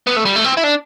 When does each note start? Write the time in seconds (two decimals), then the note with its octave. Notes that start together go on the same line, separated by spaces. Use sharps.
0.07 B3
0.16 A3
0.25 G3
0.36 A3
0.45 C4
0.57 E4
0.64 D4